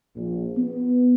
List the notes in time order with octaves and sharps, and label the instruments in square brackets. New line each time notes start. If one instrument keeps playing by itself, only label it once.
[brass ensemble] A#1
B3